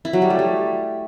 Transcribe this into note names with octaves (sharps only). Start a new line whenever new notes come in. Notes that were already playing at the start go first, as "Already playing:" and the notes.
E4
F#3
G3
A3
G3